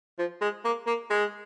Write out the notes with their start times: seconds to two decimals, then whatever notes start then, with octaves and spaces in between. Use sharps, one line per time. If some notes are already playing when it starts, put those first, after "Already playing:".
0.19 F3
0.41 G#3
0.64 A#3
0.87 A#3
1.10 G#3